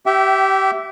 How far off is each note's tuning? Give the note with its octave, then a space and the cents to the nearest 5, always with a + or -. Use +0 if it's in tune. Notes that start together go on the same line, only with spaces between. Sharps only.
G4 -20 E5 +0 G5 -40